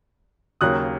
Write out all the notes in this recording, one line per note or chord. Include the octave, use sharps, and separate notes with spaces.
D#2 C#3 F#3 A#3 D#6 F#6